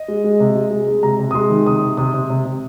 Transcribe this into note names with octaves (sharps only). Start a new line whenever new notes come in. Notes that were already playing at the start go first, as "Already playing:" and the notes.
Already playing: D#5
G#3
G#3
C3
G#3
G#3
G#3
C3 A#5
C3
D#6
G#3 C6
D#3
C3 D#6
C3
C3 D#6
C3
C3
C3